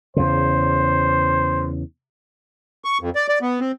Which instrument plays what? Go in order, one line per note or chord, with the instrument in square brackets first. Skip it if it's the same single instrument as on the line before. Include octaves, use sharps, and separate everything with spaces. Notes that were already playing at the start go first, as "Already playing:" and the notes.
[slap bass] E2 C#3 [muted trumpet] C5
[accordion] C#6
F2
D5
D5
B3
C4